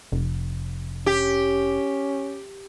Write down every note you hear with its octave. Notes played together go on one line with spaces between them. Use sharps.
F1
C#4 G4